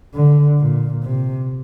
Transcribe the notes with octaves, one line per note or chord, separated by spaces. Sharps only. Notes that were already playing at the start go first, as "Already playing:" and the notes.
D3
A#2
C3